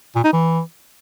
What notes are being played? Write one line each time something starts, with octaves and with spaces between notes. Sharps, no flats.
A#2
D#4
E3